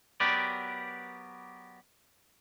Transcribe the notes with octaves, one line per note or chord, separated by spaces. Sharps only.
F#3 B3 G4 A#4 B4 D5